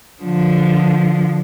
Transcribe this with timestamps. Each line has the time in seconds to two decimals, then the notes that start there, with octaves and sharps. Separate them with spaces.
0.22 D3 F3